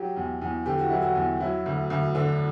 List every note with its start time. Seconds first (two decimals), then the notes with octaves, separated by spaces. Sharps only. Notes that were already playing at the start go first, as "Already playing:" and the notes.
Already playing: F#3 G4
0.16 E2
0.42 E2
0.66 D3 G4
0.78 F#4
0.90 F#3 E4
1.02 F#4
1.16 E2
1.40 F#3 E4
1.66 D2
1.90 D2
2.14 D3 D4